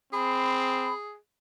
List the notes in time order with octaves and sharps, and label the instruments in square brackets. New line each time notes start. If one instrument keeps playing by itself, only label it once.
[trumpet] C4 [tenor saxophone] G#4 [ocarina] B5